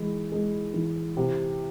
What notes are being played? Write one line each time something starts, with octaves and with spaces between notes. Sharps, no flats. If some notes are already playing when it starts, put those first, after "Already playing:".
Already playing: E3 G#3
G#3
E3
C3